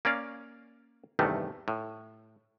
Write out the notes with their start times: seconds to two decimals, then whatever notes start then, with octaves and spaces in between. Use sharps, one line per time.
0.05 A#3 C#4 D5 F5
1.19 E2 G2 C3 D#3 A3
1.68 A2